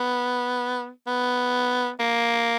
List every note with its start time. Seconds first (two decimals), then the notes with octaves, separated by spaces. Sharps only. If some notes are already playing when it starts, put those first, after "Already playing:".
Already playing: B3
1.07 B3
2.00 A#3